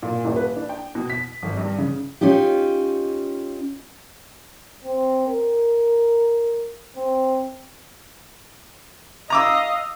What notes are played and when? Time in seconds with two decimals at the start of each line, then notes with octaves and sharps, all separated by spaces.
0.03 A#2
0.25 D#1
0.36 B4
0.56 D4
0.69 G5
0.95 B2
1.10 B6
1.42 G#1
1.57 G2
1.78 C#3
2.21 C#4 D#4 F4 G4
4.84 C4
5.28 A#4
6.97 C4
9.30 D#5 F5 A#5 D6 E6